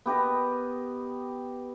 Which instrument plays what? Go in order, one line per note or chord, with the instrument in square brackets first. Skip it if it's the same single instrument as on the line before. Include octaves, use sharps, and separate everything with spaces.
[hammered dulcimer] B3 G4 B4 D#5